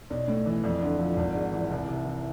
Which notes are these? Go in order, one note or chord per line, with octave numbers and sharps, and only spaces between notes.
B1 D5
A2
E3
F2 D5
D3
F3
G#1
G#2
E3
C2
C3
E3